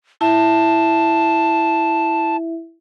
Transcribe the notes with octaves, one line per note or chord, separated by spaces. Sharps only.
E4 E5 A5